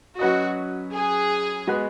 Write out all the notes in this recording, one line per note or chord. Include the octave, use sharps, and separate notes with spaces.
F#3 C#4 F#4 B4 D#5
G#4
G#3 B3 F#4 B4